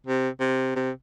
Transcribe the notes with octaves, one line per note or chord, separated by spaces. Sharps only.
C3
C3
C3